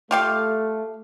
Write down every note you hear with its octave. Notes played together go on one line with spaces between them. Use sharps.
A3 F4 G4 F5